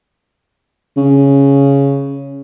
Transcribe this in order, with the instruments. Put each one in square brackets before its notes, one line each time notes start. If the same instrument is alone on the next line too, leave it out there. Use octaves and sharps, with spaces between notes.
[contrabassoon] C#3